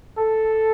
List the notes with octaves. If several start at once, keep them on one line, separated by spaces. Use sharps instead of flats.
A4